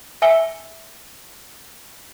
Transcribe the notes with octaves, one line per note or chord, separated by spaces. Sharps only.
E5 G#5 E6 C#7 G7